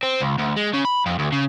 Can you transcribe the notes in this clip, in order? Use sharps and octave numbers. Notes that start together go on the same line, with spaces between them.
C4
C#2
D2
G#3
C#3
B5
F2
D2
C#3